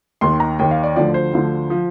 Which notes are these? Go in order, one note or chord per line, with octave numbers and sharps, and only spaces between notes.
D#2 D#3 C6
A#5
D#2 D#3 G5
F5
D5
D2 D3 F3 D5
C5
D2 D3 F3
F3